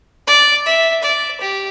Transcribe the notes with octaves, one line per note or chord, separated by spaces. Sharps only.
D5
E5
D5
G4